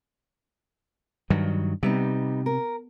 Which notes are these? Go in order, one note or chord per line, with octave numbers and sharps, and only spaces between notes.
G2 D#3 F#3
C3 G3 B3 D#4
A#4